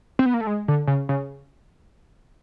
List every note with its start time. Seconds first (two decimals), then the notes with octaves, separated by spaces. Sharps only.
0.19 C4
0.26 B3
0.34 A#3
0.41 A3
0.47 G#3
0.68 D3
0.87 C#3
1.09 C#3